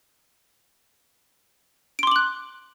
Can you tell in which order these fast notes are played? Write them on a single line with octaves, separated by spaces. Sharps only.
D7 C6 D6 F#7 F#6